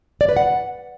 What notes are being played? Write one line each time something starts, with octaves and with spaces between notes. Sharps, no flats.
D5
B4
F#5